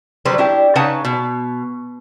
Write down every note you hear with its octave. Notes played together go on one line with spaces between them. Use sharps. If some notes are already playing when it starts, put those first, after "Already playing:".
D3 F#3 G3 B4 C5
D4 E4 G4
C#3 D#4 B4 F#5 A5
B2